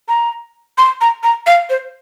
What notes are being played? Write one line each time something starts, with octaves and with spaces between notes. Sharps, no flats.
A#5
C6
A#5
A#5
F5
C5